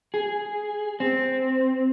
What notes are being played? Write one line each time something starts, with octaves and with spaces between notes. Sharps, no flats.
G#4
C4